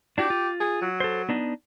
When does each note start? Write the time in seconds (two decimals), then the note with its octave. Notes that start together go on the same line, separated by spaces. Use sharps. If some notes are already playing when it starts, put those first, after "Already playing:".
0.18 D4 E4 F#4 G4
0.30 F4
0.60 G#4
0.81 F#3
1.00 A4 C5
1.29 B3 D4 D#4